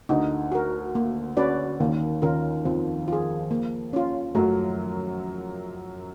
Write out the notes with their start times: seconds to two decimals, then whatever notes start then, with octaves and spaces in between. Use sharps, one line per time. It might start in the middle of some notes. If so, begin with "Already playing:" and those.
0.09 D2 D3 D#4
0.52 F#4 A#4
0.95 A#3
1.37 C#4 F#4 B4 D5
1.80 D#2 D#3 A#3
2.22 D#2 D#3 C#4 F4 A#4
2.65 F2 F3 C4
3.08 F4 G#4
3.51 A#3
3.93 C#4 F4
4.35 F#2 F#3 A3